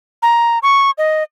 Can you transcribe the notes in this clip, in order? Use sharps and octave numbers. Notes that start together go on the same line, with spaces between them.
A#5
C#6
D#5